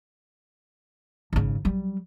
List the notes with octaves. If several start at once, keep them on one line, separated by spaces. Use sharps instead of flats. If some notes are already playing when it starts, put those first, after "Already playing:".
G#1 C#3
F#3 G3